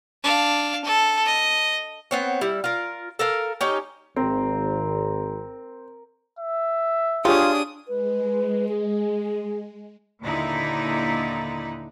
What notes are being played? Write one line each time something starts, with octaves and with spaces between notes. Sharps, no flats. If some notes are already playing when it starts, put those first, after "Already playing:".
D4 F5
A4
D#5
B3 C4 C#5
G3 E4
F4 A#4
A4 A#4 F5
C#4 D#4 G4
G#1 C4 A#4
E5
D4 F4 G4 G#4 C#5 D#6
G#3 B4
G#4
D#2 A#2 D3 D#4 E4